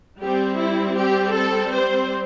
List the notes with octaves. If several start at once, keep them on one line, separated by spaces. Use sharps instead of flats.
G3 C4 G4
E4
G4
A4
C5